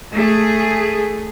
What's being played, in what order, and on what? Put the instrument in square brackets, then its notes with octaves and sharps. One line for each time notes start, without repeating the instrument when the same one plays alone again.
[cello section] A3 G#4